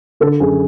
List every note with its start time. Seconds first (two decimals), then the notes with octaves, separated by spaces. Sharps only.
0.20 D3 A4
0.40 F#2 G#4